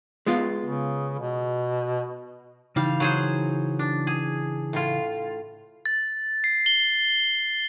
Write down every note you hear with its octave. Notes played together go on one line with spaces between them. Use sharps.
G#3 B3 F4
C#3
B2
C#3 E3 G3 D#4 F5
F#3 G#4 C5
D4
G#4
A2 F4
A6
C7
G7